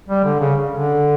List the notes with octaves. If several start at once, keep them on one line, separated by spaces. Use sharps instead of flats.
G3
D3
C#3
D3